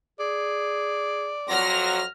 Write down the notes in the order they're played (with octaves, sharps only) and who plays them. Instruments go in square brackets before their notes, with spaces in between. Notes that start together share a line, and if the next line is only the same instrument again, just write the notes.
[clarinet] G#4 [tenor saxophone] D5
[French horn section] F2 F#3 F#4 [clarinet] C6 [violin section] F6 A#6